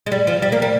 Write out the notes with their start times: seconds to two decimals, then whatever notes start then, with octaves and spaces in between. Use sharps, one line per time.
0.06 G#3
0.12 G3
0.27 F3
0.42 G3
0.52 A#3
0.62 G3